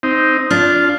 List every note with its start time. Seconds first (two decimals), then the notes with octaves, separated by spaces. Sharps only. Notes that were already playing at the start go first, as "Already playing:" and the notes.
0.03 C4 D#4
0.50 D4 F4